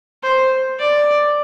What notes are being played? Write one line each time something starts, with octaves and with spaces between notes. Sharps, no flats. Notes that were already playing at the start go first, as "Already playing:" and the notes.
C5
D5